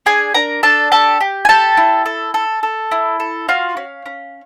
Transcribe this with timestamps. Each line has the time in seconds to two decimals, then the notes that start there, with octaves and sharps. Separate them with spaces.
0.06 D4 G#4 G#5
0.34 D4 A#4 A#5
0.63 D4 A4 A5
0.92 G4 A4 A5
1.21 G4
1.45 G#5
1.49 G4 A4 A5
1.77 E4
2.06 A4
2.34 A4
2.63 A4
2.91 E4
3.20 A4
3.48 F4 F#4 F5
3.77 C#4
4.06 C#4